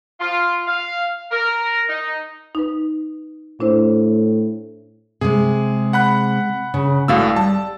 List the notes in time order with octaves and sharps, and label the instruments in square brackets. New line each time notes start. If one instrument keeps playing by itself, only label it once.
[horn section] F4
F5
A#4
D#4
[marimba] D#4 B4
[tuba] A2 [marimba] D4 E4 C5
[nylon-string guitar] C3 G#3 [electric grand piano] G#4
[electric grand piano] F#5 B5 F#6
[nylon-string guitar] C#3
[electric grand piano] G#1 A2 E6 [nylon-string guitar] F#4 D5 F5
[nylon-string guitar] G3 [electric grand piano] A5